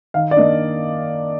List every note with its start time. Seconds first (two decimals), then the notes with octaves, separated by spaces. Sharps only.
0.14 D#3 F5
0.31 D5
0.37 A#3 D4 D#5